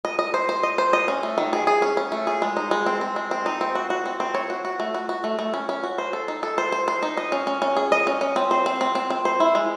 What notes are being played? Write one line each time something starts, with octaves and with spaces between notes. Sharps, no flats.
D#5
D#5
C5
C5
D#5
C5
D#5
C#4
A3
D#3
G#4
G#4
C#4
C#4
A3
G#4
G#3
D#4
G#3
C4
C4
G#3
C4
D#4
C4
F#4
F#4
C4
C4
C#5
F#4
F#4
A3
F#4
F#4
A3
A3
C#4
C#4
F#4
C5
A4
D#4
A4
C5
C5
C5
D#4
D#5
C#4
C#4
C#4
G#4
D#5
C#4
C#4
C4
C5
C4
C4
C4
C4
C5
E4
G#3